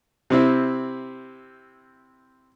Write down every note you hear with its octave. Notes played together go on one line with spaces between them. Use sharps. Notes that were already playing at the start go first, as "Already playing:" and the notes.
C3 C4 E4